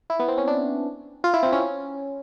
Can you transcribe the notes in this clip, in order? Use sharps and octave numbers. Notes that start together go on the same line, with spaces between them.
E4
B3
C4
C#4
D4
F4
E4
C4
C#4